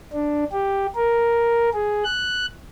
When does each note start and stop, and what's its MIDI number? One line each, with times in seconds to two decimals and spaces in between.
0.13 0.44 62
0.52 0.86 67
0.96 1.70 70
1.74 2.04 68
2.04 2.46 90